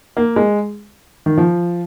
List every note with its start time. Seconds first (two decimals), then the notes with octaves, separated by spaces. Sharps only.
0.17 A#3
0.36 G#3
1.26 D#3
1.37 F3